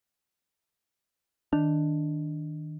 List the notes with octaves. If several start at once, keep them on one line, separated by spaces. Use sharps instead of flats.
D#3 D4